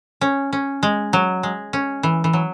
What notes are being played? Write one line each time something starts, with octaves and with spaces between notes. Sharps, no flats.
C#4
C#4
G#3
F#3
G#3
C#4
E3
E3
F#3